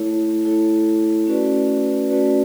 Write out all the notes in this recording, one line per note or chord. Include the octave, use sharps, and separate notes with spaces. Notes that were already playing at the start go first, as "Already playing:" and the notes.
Already playing: A3 E4 A4 C#5
A3 E4 A4 C#5
A3 C#4 F#4 B4 D5
A3 C#4 F#4 B4 D5